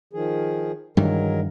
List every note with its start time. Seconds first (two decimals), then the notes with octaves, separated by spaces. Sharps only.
0.13 D#3 F3 G#4
0.97 G2 D#3 E3 F#3 G#3 A#4